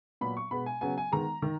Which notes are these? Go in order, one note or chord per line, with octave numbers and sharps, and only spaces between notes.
A#2 F#3 B3 B5
C#6
B2 G#3 B3 B5
G#5
C#3 F#3 B3 G#5
G#5
D#3 G#3 B3 A#5
D#3